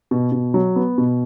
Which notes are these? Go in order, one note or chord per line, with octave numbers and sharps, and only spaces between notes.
B2
B2
F#3
B3
B2